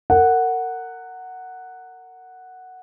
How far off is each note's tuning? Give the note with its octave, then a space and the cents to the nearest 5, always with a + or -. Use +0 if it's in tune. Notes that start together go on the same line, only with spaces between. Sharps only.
A#4 -30 F#5 +0